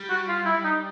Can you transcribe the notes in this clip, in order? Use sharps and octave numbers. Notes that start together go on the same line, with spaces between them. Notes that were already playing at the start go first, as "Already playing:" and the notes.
Already playing: G3
F#4
F4
E4
D#4